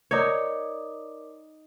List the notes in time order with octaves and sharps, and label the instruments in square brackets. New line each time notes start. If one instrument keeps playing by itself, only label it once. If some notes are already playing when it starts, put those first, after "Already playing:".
[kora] D#4 C#5 [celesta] A#4 D5 D6